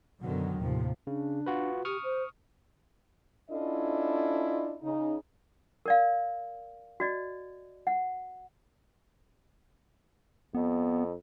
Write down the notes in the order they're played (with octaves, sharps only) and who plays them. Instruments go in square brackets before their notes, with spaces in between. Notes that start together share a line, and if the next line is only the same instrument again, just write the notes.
[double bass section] F#2 B2 D3 D#3 F#3
D#2 A2 C3 F3
[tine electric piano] C#3 [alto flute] D4
[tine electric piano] F4 F#4 B4
[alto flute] G4 [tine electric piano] C#6 D#6 F6
[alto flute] C5
[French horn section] C#4 D4 E4 F4 A4 D#5
C#3 D#4
[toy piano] A#4 D5 F5
F#4 D5 D#5
F#5
[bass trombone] F2 [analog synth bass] B3